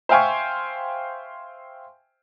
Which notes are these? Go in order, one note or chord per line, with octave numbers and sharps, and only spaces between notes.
C5 E5 F5 G5 G#5 C#6